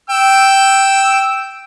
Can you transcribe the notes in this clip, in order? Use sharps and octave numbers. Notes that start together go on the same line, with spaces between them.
G5 E6